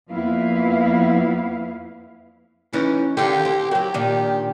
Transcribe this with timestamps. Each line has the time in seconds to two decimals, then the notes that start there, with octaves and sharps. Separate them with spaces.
0.11 F2 A#3 B3 E4 B4 F5
2.73 E3 C#4 D#4
3.17 D3 D#3 G4
3.45 C4
3.71 F#3 G4 A#4
3.94 A#2 D#3 D4